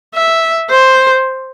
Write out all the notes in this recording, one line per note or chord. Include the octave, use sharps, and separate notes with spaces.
E5
C5